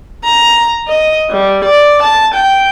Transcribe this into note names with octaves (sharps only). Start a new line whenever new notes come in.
A#5
D#5
G3
D5
A5
G5